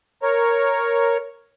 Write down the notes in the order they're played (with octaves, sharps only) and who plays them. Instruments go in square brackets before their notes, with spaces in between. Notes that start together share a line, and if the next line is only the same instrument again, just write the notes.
[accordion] A#4 C#5